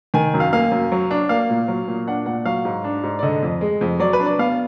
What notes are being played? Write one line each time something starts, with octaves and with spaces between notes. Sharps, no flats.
D#3 G#5
F#2
F5
A#3 F5
F#2
F#3
D4
A#3 F5
A#2
F#3
A#2
D4 F#5
A#2 F#5
F#3 F5
G#2
D4
G#2
D5
D3 D#5
F2
G#3
F2
F#3 D5
B4
D4
D5
B3 F5